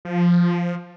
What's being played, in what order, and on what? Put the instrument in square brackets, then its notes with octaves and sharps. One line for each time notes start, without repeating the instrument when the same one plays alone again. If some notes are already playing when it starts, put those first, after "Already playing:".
[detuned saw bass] F3